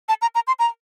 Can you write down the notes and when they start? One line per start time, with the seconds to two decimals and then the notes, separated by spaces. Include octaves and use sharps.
0.09 A5
0.22 A#5
0.35 A#5
0.47 C6
0.59 A#5